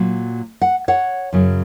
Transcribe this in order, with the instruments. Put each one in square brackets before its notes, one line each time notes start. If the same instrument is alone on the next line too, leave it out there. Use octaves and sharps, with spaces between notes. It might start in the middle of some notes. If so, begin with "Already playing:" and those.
Already playing: [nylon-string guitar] A#2 F#3
F#5
C#5 F#5
F#2 C#3 F#3